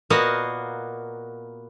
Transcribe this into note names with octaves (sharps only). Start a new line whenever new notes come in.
A#2 A#3 B3 F#4 D#5 F5